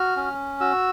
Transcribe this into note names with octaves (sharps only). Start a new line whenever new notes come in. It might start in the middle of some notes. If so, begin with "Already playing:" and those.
Already playing: F#4 F6
C#4
F#4 E6